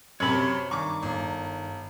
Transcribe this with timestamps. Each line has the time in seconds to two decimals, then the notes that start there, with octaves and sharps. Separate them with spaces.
0.20 F#2 C3 C#5 B5
0.71 G2 D#3 C#6 D6
1.03 G1